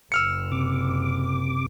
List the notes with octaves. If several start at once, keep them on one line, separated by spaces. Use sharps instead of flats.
F#1 E6 F6 C#7
C3 D6